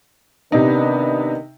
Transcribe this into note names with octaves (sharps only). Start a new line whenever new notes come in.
C3 D#3 B3 D4 D#4